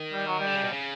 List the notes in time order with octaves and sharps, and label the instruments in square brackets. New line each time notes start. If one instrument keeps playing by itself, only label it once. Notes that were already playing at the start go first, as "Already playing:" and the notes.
Already playing: [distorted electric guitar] D#3
[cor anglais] G3
F#3
G3
[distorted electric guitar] D3
C#3
B2
C#3